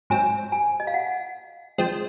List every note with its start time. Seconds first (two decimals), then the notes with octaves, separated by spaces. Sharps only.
0.10 G#2 F#3 C4 G#5
0.52 G#5
0.80 D#5
0.87 F5
0.94 F#5
1.78 F3 G#3 C4